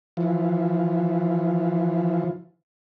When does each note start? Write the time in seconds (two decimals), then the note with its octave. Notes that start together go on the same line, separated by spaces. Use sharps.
0.17 E3 F3